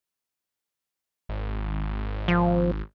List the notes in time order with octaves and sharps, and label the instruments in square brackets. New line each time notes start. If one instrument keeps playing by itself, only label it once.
[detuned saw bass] G#1
[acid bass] F3